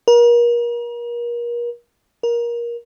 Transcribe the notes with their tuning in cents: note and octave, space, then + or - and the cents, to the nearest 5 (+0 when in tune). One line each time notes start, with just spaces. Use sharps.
A#4 +35
A#4 +20